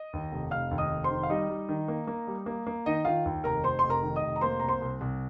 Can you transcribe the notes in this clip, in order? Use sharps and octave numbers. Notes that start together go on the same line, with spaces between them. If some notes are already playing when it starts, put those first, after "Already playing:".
Already playing: D#5
D#2
F1
F1 F5 F6
D#2
D#5 D#6
F1
C5 C6
D#3
F5
G3 D#4 D#5
G3
D#3
A#3
A#3
G3
A#3
A#3
D#3 D#4 D#5
D#3 F4 F5
D#2
F1 A#4 A#5
F1 C5 C6
F1 C6
A#4 A#5
D#3
D#5 D#6
F1
A#5
A#3 C5 C6
C2 A#5
C5 C6
C2
C2